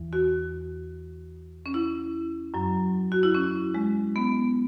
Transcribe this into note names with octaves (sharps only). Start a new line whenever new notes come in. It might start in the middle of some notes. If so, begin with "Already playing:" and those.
Already playing: E2 E3
F#4
C#4
E4
F#2 F#3
F#4
E4
C#4
G#3
B3